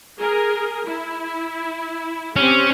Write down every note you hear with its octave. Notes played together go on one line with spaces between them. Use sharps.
G#4 A#4
E4
C4 C#4 G4